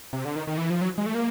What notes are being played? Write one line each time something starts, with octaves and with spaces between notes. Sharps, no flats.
C3
D3
D#3
D#3
E3
F3
F#3
G#3
A3
A#3